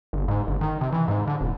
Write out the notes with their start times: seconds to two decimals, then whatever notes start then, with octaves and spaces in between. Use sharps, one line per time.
0.13 G1
0.28 G#2
0.47 G1
0.61 D#3
0.81 C3
0.92 E3
1.08 G#2
1.27 D3
1.41 E1